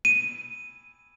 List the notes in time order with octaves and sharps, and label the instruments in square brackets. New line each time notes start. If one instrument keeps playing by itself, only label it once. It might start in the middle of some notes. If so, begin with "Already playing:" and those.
[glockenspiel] D#7